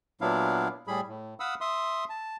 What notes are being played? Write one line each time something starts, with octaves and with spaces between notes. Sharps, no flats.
A#2 F#3 B3 D4 E4 F5
A2 G3 G#4 B5
A2
F5 F#5 B5 D#6 E6
E5 C6 D#6
A5